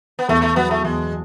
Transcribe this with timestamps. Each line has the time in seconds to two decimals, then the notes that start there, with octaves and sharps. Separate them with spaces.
0.19 B3
0.29 E2 A3
0.42 A3
0.56 F#3 B3
0.71 A3
0.84 E2 G#3